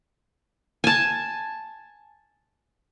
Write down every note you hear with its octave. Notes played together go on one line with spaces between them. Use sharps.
G#5 A5